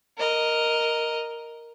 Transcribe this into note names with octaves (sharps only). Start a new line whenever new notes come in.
A#4 D#5